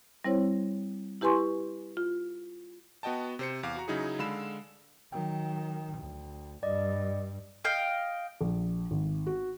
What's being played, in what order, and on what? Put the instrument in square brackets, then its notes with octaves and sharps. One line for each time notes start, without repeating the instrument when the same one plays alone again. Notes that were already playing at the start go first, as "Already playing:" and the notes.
[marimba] G3 C4 E4 C5 C#5
E4 G4 B4 G#5 C6 C#6
F4
[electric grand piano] B3 F#4 D#5 G5 A5
C3 C5 C#7
E2 F5 D6
F#4 A#5
C#3 F#3 D#4 E4 G#4
D3 G#3 F5 B5 E6 E7
[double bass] D#3 F#3 [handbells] G5
[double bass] D2
[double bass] G2 [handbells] D5 D#5
[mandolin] D#5 F5 G5
[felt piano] A#1
G#1
F#4